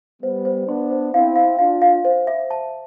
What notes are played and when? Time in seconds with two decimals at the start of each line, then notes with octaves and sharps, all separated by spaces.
0.22 G3 B3 C5
0.45 C5
0.67 B3 D4 C6
0.90 C5
1.13 C4 E4 F5
1.36 F5
1.59 D4 F4 F5
1.82 F5
2.05 C5
2.27 E5
2.51 A5